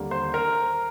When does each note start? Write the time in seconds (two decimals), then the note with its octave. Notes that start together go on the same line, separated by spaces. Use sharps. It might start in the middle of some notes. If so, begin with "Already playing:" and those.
Already playing: D#2 D3 G3 A#3 D4
0.11 C5
0.34 A#4